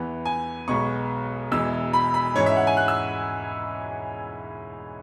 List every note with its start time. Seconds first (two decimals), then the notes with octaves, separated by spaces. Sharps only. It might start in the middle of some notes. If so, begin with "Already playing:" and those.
Already playing: E2 E3 B3
0.26 G#5
0.68 B1 B2 G#3 B3 C#6
1.51 E1 E2 E3 G#3 E6
1.93 B5
2.14 B5
2.35 G#2 E3 G#3 C#4 C#5
2.46 E5
2.56 F#5
2.67 G#5
2.77 F#6
2.88 E6